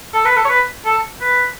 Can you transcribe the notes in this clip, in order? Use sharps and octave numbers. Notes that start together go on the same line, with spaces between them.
A4
B4
A4
C#5
B4
A4
B4